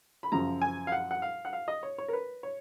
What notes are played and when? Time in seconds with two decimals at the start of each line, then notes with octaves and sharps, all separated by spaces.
0.23 B5
0.32 F#2 C#3 F3 A#5
0.62 G#5
0.87 F5
0.92 F#5
1.11 F#5
1.22 F5
1.45 F#5
1.53 F5
1.68 D#5
1.83 C#5
1.98 C#5
2.08 A#4
2.13 B4
2.43 C#5